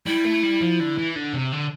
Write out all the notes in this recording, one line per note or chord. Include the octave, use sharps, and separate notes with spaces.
G3 E4
A3
G3
F3
D3
E3
D3
C3
D3